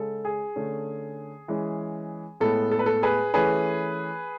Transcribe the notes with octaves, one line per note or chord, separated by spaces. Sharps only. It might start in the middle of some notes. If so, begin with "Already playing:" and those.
Already playing: C#3 G#3 C#4 A4
G#4
D3 A3 C#4
E3 G#3 C#4
A2 G#3 B3 A4
A4
B4
A4
G#4 B4
E3 A3 C#4 G#4 B4